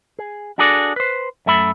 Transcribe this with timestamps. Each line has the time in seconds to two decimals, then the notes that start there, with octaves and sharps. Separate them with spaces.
0.19 G#4
0.58 D4 F#4 G#4 A4 D5
0.96 B4 C5
1.46 F#2 A3 E5 B5